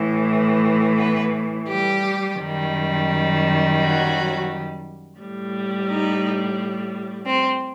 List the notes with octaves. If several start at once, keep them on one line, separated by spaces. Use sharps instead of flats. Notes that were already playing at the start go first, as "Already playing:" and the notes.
Already playing: A2 E3 A3
B3 B4
G3 G4
F#2 D#3 G3
F#3 F#4
A2 G3
D#4
C4